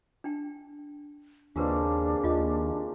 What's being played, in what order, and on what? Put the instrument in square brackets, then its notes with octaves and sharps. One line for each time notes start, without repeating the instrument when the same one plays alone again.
[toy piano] D4 D#4 G5
[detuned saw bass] D#2 [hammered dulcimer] C#3 A#3 C4 [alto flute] D4 [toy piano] F4 A#4 B4
[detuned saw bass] D#2 [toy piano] F4 D#5